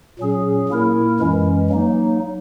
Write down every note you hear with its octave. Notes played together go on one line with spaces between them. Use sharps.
A#2 F#3 C#4 G#4
A#2 A#3 E4 A#4
F#2 E3 G#3 C#4
F#3 A#3 D#4